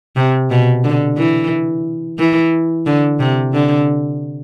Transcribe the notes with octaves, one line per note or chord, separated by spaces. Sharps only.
C3
B2
D3
E3
E3
D3
C3
D3